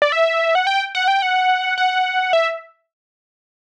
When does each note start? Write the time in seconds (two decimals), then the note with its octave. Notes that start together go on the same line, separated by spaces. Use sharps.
0.02 D5
0.12 E5
0.55 F#5
0.67 G5
0.95 F#5
1.08 G5
1.22 F#5
1.78 F#5
2.33 E5